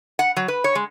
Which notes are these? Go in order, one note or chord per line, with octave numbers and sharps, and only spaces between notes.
F#5
F#3
B4
C#5
G#3